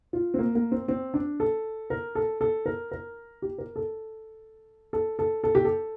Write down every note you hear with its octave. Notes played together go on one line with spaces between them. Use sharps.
F4
C4
A#3
A#3
C4
C4
D4
A4
A#4
A4
A4
A#4
A#4
G4
A#4
A4
A4
A4
A4
G4
A4